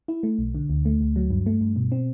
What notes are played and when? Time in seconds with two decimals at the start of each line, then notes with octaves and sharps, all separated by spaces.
0.08 E4
0.23 A3
0.39 B1
0.55 D3
0.70 D2
0.85 A3
1.01 D2
1.16 F#3
1.30 G2
1.46 A3
1.61 G2
1.76 B2
1.92 C4